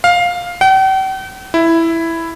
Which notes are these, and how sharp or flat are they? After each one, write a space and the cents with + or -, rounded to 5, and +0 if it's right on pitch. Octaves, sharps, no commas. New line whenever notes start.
F5 +10
G5 -45
E4 +5